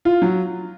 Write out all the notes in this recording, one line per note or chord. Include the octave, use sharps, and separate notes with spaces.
F4
F#3